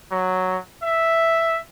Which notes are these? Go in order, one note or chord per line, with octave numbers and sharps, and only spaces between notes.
F#3
E5